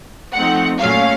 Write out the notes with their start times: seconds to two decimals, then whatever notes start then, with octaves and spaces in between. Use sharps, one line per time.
0.34 F3 A3 C4 D#4 F#5
0.80 A#2 F#3 A3 C#4 F5